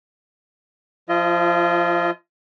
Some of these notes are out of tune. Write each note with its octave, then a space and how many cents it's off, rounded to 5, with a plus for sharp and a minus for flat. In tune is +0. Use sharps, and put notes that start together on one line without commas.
F3 +0 F4 -30 D#5 +10